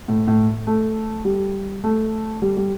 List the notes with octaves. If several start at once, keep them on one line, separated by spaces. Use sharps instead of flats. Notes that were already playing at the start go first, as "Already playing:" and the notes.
A2
A2
A3
G3
A3
G3
G3